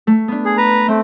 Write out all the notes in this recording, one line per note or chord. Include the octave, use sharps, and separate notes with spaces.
A3
B3 D4
G#4
B4 A#5
A3 C4